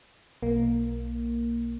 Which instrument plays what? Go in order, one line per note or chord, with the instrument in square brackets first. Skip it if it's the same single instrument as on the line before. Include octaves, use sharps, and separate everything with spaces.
[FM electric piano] B1 A#3